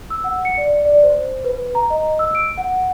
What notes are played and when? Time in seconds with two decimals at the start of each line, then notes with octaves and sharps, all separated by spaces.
0.10 E6
0.24 F#5
0.45 C#7
0.58 D5
0.85 D5
1.03 C5
1.44 B4
1.75 A#5
1.90 D#5
2.19 E6
2.35 D7
2.58 F#5